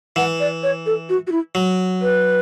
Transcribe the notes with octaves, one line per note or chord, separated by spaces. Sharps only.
E3 F#5
D5
C#5
A4
F#4
F#4
E4
F#3
B4